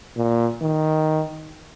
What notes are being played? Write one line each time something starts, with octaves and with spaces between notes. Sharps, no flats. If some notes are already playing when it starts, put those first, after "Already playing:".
A#2
D#3